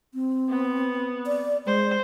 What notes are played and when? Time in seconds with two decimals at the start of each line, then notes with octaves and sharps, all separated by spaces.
0.14 C4
0.49 B3
1.26 D5
1.66 G#3 C5